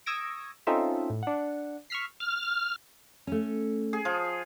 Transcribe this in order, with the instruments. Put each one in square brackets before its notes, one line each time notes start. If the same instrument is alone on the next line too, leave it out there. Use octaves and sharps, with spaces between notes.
[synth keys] C#6 D#6 E6 G#6 A#6 D7
C4 C#4 D#4 F4 A4 E5
A2
D4 F#5
C#6 E6 F6 B6 C7
[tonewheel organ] F6
[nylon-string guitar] A3 C#4
[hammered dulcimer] G#4
F3